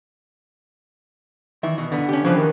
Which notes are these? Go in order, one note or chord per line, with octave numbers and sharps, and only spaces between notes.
D#3 E3 E5
B2
D3 B3
C#4 G4
C#3 E3 F3 B4
D#3